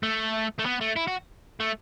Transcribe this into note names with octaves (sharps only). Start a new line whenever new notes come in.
A3
A3
B3
A3
E4
F#4
A3